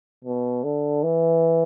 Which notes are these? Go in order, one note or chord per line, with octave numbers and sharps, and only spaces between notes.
B2
D3
E3